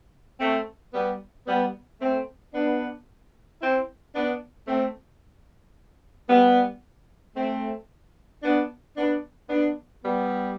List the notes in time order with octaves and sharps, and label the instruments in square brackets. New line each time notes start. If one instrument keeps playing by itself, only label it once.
[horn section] A3 C4
G3 B3
G3 B3
A3 C4
B3 D4
C4 E4
B3 D4
A3 C4
G3 B3
A3 C4
B3 D4
B3 D4
B3 D4
G3 B3